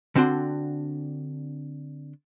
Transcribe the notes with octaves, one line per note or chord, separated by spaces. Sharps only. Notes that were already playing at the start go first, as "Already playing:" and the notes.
D3 C4 D4 F#4 C6